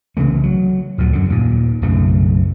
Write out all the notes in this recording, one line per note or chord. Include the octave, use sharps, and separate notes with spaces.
C2 C#3 E3 A3
F#3
D2 A#2 F#3
F#2 D3
D#2 A#2
B1 F#2 C#3 A3